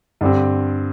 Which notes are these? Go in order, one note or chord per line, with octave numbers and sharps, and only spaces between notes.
G2 D3 G3 C4